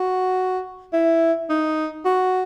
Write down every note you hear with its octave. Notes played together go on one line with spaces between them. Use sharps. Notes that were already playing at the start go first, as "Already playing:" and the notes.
Already playing: F#4
E4
D#4
F#4